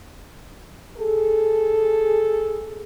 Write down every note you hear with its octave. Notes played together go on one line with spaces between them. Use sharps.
G#4 A4